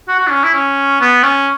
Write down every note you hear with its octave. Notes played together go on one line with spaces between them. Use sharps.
F#4
F#4
D4
C#4
E4
C#4
B3
C#4